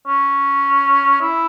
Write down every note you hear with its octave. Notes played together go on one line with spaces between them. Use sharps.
C#4
E4